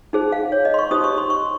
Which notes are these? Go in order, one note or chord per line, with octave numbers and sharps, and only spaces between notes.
D#4 G#4 C5
F5
C#5
D#5
C6
C#6
D#4 G4 C5 D#6
C#6
C6
C#6